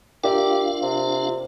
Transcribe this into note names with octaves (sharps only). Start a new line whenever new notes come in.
D4 F4 G4 A#4 D5 E5 F5
C3